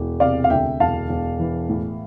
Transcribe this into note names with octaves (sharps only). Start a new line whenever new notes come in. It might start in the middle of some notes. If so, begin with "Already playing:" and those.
Already playing: E1
C3 D5 F5
F5
D2 E5 G5
E1 F5 A5
E1
E3
A2